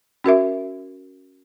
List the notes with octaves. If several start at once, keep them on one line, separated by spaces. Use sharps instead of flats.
C#4 F#4 A#4 E5